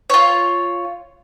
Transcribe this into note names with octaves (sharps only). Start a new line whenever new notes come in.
F4 C#5